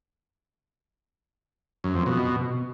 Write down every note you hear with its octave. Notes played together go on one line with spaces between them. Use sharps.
F#2
F2
B2